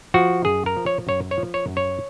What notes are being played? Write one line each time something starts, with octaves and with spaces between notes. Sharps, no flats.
F3 F#4
F#2 G#4
A#4
F3
C#5
F#2 C#5
C#5
F3
C#5
F#2
C#5